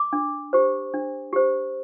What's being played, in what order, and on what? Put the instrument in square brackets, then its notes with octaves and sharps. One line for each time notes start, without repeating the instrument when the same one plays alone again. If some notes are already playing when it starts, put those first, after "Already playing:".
Already playing: [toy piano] D6
D4
G4 C5
D4
G4 C5